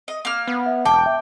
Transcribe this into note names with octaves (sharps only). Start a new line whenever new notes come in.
D#5
A#3 F6
B3
E5
E1 G5 A5 D6
E5